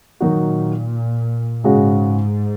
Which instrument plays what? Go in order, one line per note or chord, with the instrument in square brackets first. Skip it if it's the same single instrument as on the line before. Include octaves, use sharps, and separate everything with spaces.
[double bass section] A#2 [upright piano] D#3 F#3 D#4 F#4
[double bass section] G#2 [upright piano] C#3 G#3 C#4 F#4